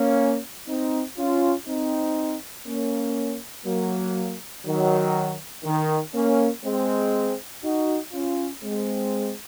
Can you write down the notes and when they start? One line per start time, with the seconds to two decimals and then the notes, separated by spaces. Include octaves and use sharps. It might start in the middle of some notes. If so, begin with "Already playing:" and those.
Already playing: A#3 C#4
0.67 C4 D#4
1.18 C#4 F4
1.67 C4 D#4
2.67 A#3 C#4
3.66 F#3 A#3
4.66 D#3 F#3
5.65 D#3
6.14 A#3 C#4
6.64 G#3 C4
7.63 D#4 F#4
8.13 C#4 F4
8.63 G#3 C4